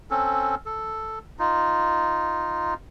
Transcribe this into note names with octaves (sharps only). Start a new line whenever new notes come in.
C4 C#4 A4
A4
D#4 F4